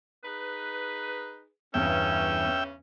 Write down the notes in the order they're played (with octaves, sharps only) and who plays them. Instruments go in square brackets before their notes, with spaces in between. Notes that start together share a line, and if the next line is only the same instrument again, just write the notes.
[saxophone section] D#4 G#4 B4
[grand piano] G1 E2 G2 [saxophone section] C#3 E3 C#4 [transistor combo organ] E5 G5